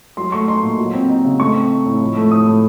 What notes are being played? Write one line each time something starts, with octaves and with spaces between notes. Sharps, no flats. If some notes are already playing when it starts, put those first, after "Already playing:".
F#3 C6
A3 C#6
D#4 C6
A#2
F#3
C4
D#4
C#3
A3 C#6
C4
D#4
A2
F3
A3
A2 D#6
A2